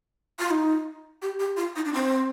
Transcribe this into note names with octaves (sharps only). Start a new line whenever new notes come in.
F4
D#4
G4
G4
F4
D#4
D4
C4